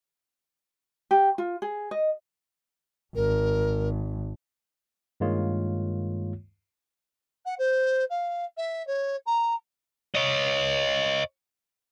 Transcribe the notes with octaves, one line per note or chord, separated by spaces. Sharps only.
G4
F4
G#4
D#5
G#1 A#4
G2 D#3 G#3 A#3 F4 C#5
F#5
C5
F5
E5
C#5
A#5
C#5 D#5